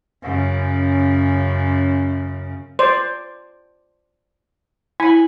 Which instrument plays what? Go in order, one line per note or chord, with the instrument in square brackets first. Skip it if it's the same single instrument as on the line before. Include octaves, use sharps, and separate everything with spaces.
[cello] F#2 C#3
[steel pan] C5 D5 [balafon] C6
[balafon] E4 [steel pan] G#5 B5